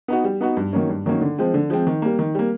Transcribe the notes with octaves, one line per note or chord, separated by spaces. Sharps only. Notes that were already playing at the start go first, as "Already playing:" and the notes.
B3 D#4 F#4
G3
B3 D#4 F#4
G2
D#3 F#3 A#3 C#4
G2
D#3 F#3 A#3 C#4
D3
F3 G#3 C4
D3
F3 G#3 C4
D#3
G3 A#3
D#3
G3 A#3